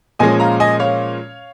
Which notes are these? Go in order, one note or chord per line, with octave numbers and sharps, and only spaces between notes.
A#2 F3 G#3 C#4 D#5 G#5
F5 A#5
D#5 G#5
C#5 F5